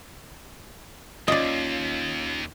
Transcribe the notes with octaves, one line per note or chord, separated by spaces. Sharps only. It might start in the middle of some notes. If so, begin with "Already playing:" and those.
D#2 C#4 F4 D5 D#5